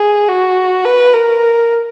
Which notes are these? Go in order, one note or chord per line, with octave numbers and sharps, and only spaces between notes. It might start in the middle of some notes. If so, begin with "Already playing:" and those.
Already playing: G#4
F#4
B4
A#4